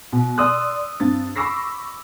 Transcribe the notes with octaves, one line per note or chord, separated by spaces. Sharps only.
B2
D5 C6 D#6 E6 F#6
G2 C4 A6
B5 C#6 D6 E6 A#6 C7